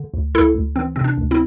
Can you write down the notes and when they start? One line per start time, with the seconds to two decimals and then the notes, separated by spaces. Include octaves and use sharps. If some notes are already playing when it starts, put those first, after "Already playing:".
Already playing: D3
0.14 D2
0.35 D2 E4 A4
0.55 D2
0.76 E3 C4
0.96 C3 C4
1.04 D4
1.18 D2
1.31 C4 E4